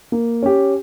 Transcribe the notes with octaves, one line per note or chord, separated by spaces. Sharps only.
A#3
C#4 G4